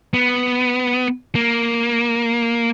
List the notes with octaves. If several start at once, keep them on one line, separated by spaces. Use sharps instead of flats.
B3
A#3